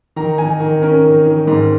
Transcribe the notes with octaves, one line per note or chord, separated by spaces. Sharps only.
D#3 A#5
D#3 G#5
D#3
C#4 A#4
D#3
D#3
G#2